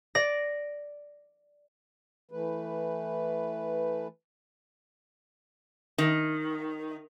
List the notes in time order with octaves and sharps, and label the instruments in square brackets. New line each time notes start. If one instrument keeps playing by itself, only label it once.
[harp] D5 A#6
[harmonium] E3 A3 B4
[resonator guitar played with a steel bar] D#3